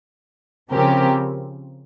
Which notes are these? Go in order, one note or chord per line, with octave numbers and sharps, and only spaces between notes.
C#3 F3 C4 G4 A#4